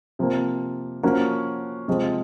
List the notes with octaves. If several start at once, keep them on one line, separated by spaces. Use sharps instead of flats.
C3 F3 A#3
F3 A#3 C#4 F#4
C3 F3 G#3